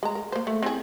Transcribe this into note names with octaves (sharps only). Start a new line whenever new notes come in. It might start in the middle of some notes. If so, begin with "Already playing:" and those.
G#3 A#5
A#4
A#3 C5
A3
C4 E4 G#4